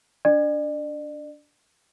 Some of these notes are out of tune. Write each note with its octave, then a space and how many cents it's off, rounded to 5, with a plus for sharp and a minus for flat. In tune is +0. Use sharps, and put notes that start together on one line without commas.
D4 -15 D5 +40